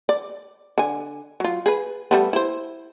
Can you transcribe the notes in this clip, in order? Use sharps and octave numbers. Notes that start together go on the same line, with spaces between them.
D5
D3 G#5
F#3 F4
G#4 B4
G3 A3 B3
E4 C5